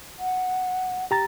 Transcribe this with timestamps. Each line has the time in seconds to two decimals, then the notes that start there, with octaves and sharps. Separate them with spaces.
0.19 F#5
1.11 G4 A#5 A6